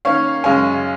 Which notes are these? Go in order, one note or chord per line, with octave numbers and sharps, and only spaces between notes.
D#3 A#3 C#4 C#5 F5
F#2 C#3 G#3 C#4 F5 G#5